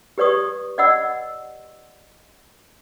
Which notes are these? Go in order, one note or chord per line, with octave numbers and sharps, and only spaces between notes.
G4 B4 D5 C#6 D#6
D5 D#5 F#5 B5 E6